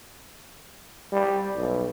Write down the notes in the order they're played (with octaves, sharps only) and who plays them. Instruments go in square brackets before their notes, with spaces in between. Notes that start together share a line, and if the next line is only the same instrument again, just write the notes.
[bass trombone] G3
B1